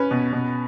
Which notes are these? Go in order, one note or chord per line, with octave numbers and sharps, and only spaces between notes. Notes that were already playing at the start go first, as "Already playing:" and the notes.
Already playing: C#4 B4
B2
B2